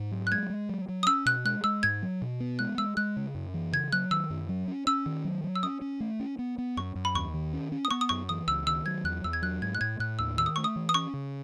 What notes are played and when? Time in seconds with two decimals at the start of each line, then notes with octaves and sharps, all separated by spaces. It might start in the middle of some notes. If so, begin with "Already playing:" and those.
Already playing: G#2
0.12 F#3
0.27 F#6
0.32 G#3 G#6
0.50 G#3
0.69 F#3
0.89 F#3
1.03 D#6
1.06 C#4 E6
1.26 B2 F#6
1.45 G#3 F#6
1.64 G#3 E6
1.83 G#2 G#6
2.02 F#3
2.22 B2
2.40 B3
2.59 G#3 F#6
2.78 G#3 E6
2.97 G#3 F#6
3.16 C#3
3.35 F#2
3.54 E3
3.73 C#3 G#6
3.93 F#3 F#6
4.11 D#3 E6
4.30 F#2
4.49 F#3
4.68 C#4
4.87 C#4 E6
5.06 D#3
5.25 F#3
5.44 F#3
5.55 E6
5.63 C#4 D#6
5.81 C#4
6.00 A3
6.20 C#4
6.39 B3
6.58 B3
6.77 F#2 C#6
6.95 F#2
7.05 B5
7.15 D#2 C#6
7.34 D#3
7.53 C#4
7.72 C#4
7.85 D#6
7.91 B3 C#6
8.01 D#6
8.09 F#2 C#6
8.29 E3 D#6
8.47 C#2 E6
8.67 D#3 E6
8.86 F#3 G#6
9.04 E2 F#6
9.24 E2 E6
9.33 G#6
9.42 F#3 F#6
9.62 G#2 G#6
9.75 F#6
9.81 A2 G#6
10.00 A2 F#6
10.19 D#2 E6
10.37 D#3 E6
10.46 D#6
10.56 A3 C#6
10.64 D#6
10.76 E3
10.89 D#6
10.94 C#4 C#6
11.14 C#3